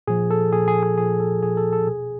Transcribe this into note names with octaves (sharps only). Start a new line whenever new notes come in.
A#2 F3 G#4
A4
A#2 F3 G#4
G#4
G#4
A#2 F3 G#4
A4
A#2 F3 G#4
A4
A4
B2 G#4